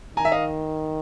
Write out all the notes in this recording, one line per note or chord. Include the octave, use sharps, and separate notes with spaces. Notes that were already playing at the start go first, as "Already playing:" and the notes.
D#3 G#5 A#5
E5
D#5 F5